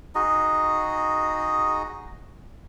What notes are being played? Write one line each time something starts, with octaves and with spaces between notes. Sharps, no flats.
D#4 F#4 G#4 D#5